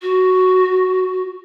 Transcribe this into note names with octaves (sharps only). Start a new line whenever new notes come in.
F#4